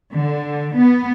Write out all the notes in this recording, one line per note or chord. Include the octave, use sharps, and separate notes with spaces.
D3
B3